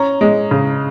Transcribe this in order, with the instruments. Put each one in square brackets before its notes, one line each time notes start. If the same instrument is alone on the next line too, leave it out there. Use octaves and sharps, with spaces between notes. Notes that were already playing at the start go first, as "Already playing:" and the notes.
Already playing: [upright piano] C#4 A#5
G#3
C#3